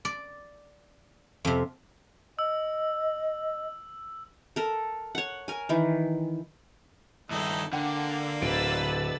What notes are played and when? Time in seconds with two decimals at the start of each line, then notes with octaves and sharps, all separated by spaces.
0.05 D5
1.45 F2 C3
2.39 D#5 E6
4.56 A4 A#4
5.15 C#5 F#5
5.48 A#4 G#5
5.69 D#3 E3
7.31 G2 D#3 D#4 E4 A4
7.73 D3 A#3 F#5 G5
8.41 D1 B4 E6 A6 D7